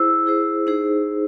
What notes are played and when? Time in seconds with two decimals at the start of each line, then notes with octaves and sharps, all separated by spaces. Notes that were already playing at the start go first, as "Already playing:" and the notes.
Already playing: E4 G#4 C5 E6
0.26 E4 G#4 C5
0.67 D#4 G#4 C5